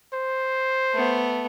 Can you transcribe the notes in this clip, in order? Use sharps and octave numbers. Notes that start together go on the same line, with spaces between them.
C5
A3 B3